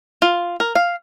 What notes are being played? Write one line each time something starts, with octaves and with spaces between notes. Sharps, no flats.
F4
A#4
F5